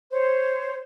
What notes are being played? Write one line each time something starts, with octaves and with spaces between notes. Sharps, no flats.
C5 C#5